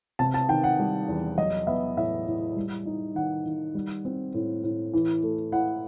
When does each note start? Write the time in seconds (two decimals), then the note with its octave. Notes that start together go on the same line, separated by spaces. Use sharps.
0.19 C3 A5
0.34 A5
0.49 D#3 G5
0.64 F#5
0.79 G3
1.08 E2
1.38 F#3 D#5
1.67 B3 E5
1.97 A2 E5
2.27 A2
2.56 G3
2.86 D#4
3.15 D#3 F#5
3.46 D#3
3.75 G3
4.05 C4
4.34 A2
4.64 A2
4.93 E3
5.23 A3
5.52 E4 F#5